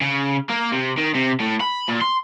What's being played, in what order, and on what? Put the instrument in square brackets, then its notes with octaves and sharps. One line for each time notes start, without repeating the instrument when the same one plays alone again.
[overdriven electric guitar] C#3
A#3
C3
D#3
C3
A2
B5
A#2
C6